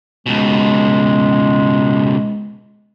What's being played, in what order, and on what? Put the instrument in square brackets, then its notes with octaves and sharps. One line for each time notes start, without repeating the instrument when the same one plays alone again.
[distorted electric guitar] C#2 B2 [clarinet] G#3